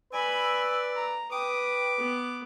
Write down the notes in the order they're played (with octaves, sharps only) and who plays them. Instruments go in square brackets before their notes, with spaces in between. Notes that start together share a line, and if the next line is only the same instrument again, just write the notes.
[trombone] B4 [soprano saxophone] D5 [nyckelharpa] G#5 B5 [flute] E6
[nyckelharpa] A#5
[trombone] B4 [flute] G5 [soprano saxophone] D6 [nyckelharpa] D#6
[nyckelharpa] B3